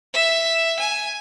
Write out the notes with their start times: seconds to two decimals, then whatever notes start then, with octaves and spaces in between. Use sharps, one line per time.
0.14 E5
0.80 G#5